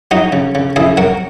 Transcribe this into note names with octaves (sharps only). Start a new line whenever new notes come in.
F#3 D#4 F#4
C#3
C#3
C#3 E4 G#4
F#3 F#4 A#4